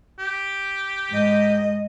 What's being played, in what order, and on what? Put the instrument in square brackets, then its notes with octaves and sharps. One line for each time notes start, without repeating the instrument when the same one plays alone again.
[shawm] G4
[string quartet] G#2 D#5